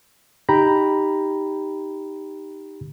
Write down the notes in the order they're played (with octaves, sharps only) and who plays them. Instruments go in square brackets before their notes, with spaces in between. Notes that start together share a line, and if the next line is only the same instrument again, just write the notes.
[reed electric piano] D#4 G4 G5 A#5 B5